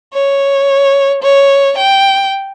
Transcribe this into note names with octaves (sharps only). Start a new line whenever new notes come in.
C#5
C#5
G5